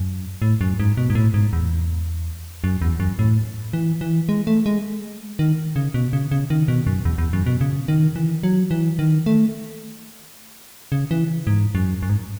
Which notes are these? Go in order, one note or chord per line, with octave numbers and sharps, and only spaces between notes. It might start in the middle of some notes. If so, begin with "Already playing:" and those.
Already playing: F#2
A2
F#2
G#2
B2
G#2
A2
G#2
E2
F#2
E2
F#2
A2
E3
E3
G#3
A3
G#3
D#3
C#3
B2
C#3
C#3
D#3
B2
F#2
E2
E2
F#2
B2
C#3
D#3
E3
F#3
E3
D#3
A3
C#3
E3
G#2
F#2
F#2
G#2